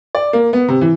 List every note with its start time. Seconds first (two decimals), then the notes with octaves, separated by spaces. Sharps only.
0.15 D5
0.33 A#3
0.53 B3
0.68 C3
0.81 E3